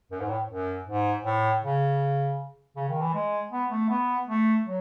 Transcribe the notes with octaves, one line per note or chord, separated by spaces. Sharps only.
F#2
G#2
A2
F#2
G#2
A2
C#3
C#3
D#3
E3
G#3
B3
A3
B3
A3
F#3